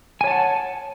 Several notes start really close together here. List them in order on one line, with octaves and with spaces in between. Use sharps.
G#5 C#5 A5 F#5